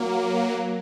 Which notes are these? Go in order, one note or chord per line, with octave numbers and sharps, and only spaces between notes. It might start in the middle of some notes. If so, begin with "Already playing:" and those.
Already playing: F#3 A#3